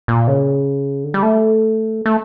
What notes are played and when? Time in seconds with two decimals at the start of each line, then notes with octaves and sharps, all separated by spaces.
0.08 A#2
0.28 C#3
1.04 D3
1.14 G3
1.23 A3
2.06 A3